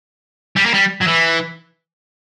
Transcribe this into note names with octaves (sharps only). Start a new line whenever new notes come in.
G3
A#3
G3
F#3
E3